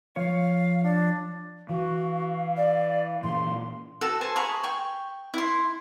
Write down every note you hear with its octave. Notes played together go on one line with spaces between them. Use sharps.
F3 F4 C#5 F5
D4
E3 F#4 F5
D5
A#2 E3 C6
F#4 A4
C5 G#5 A5
G#4 A#5 B5 C#6
G5 C#6
E4 C6